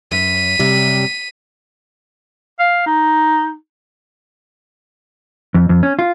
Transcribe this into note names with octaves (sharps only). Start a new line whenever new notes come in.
F#2 B6 D#7
F#2 C3 G3
F5
D#4
F2
F2
C#4
F4